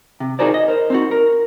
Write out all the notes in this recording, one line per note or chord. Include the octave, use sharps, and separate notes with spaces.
C3
D#4 F#4 G#4 A#4 C5 D5
D#5
A#4 C5
C4 D#4 F#4
A#4